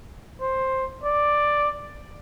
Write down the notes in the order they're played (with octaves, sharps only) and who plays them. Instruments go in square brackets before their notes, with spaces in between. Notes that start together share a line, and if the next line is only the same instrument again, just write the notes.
[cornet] C5
D5